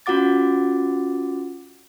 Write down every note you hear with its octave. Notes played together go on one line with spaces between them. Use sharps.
C#4 F4 F#4 F#5 D6 A6